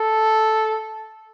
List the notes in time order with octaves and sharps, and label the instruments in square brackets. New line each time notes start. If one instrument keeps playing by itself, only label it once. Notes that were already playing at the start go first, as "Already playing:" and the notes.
Already playing: [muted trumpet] A4